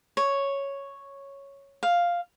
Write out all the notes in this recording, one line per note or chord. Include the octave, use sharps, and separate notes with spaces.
C#5
F5